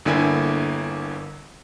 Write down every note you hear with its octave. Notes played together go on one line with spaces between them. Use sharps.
G1 D3 A#3 E4 G#5